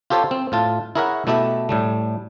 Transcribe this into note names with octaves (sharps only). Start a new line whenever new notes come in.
F4 G4 A4 C5 C#5
C4
A2 F4 A5
E4 G#4 A#4 C#5 E5 F#5
B2 A3 E4 G4 A4 E5
A2 G3 A3